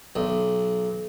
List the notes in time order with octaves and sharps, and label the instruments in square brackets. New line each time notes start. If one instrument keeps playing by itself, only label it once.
[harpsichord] B1